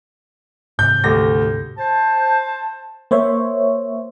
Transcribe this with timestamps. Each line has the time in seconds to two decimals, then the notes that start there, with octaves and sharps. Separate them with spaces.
0.79 G#2 C3 G6
1.04 D2 G4 A#6
1.78 C5 A5
3.11 A#3 C5 C#5 E5